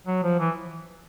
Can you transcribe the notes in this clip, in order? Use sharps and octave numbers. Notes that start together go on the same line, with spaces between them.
F#3
F3
E3